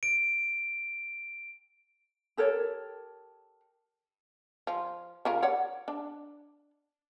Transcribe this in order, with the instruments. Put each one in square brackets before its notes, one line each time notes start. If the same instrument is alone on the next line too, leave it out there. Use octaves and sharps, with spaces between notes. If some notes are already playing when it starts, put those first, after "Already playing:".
[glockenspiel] D7
[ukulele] G4 A4 A#4 C#5
[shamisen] F3
C#3 F4 A#4
C#5 D5 F#5
D4